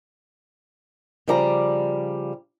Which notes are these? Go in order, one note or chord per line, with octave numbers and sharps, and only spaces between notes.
C#3 F3 G3 D5 A#5